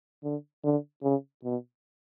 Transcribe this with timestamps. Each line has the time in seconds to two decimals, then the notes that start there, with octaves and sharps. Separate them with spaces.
0.24 D3
0.64 D3
1.03 C#3
1.44 B2